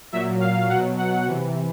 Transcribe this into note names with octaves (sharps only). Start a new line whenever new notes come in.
A#2 F#3 E5
F5
B2 F#3 F#5
F#5
C3 E3